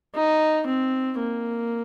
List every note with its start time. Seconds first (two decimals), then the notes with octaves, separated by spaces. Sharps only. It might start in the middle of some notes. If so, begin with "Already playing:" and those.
0.16 D#4
0.67 C4
1.19 A#3